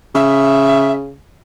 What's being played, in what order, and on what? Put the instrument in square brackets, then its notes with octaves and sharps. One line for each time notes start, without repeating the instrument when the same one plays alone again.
[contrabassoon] C#3 [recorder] E5